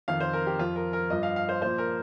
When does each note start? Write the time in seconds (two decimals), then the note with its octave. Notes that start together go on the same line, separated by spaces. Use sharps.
0.08 F2 D#3 F5
0.20 C5
0.33 A#4
0.47 G4
0.59 F2 F3 F4
0.76 A#4
0.93 A#4
1.10 G2 F3 D#5
1.23 F5
1.36 F5
1.49 C5
1.61 A#2 F3 C5
1.78 A#4